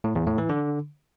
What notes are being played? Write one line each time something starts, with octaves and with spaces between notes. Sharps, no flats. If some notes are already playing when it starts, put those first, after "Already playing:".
A2
E2
A2
E3
D3